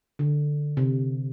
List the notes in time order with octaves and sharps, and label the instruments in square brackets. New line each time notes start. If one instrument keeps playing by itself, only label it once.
[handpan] D3
C3